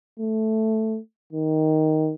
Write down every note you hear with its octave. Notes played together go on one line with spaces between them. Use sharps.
A3
D#3